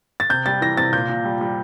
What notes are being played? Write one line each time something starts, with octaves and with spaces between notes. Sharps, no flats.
A6
C3 G6
G3 A6
E3 A#6
C3 A6
A#2 G6
A#2
G3
G3